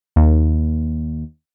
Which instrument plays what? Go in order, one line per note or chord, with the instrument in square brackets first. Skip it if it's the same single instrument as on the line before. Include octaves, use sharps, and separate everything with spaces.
[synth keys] D#2